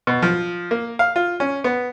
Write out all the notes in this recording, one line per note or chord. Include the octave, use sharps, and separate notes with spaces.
B2
F3
A#3
F5
F4
C#4
B3